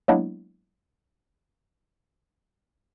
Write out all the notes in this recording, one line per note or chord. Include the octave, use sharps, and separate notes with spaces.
F#3 G#3 A#3 B3 D4 E4